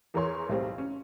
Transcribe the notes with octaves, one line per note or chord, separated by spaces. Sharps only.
E2 E3 A#4 C#5 C6
B1 A2 G3 C4
C#4